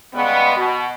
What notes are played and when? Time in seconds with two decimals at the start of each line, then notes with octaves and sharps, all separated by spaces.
0.13 C#3 G3 G#3 B3
0.56 B2